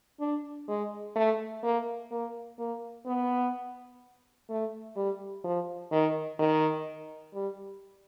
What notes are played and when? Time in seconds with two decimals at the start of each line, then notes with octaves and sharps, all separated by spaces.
0.20 D4
0.68 G#3
1.16 A3
1.63 A#3
2.11 A#3
2.59 A#3
3.06 B3
4.49 A3
4.96 G3
5.44 F3
5.92 D#3
6.39 D#3
7.34 G3